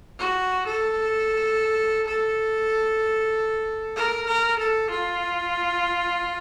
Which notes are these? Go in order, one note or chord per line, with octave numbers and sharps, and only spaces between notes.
F#4
A4
A4
A#4
A#4
A4
F4